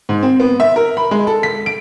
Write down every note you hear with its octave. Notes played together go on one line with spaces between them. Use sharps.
G#2
C4
B3
E5
A#4
B5
G#3
A4
B6
D7